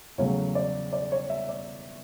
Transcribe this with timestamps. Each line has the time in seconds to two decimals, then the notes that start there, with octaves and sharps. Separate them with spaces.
0.18 E2 C#3 F#3 A3 C#5
0.55 D5
0.93 D5
1.12 C#5
1.29 E5
1.49 D5